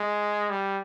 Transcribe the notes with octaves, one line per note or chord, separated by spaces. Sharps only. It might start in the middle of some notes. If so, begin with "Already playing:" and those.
Already playing: G#3
G3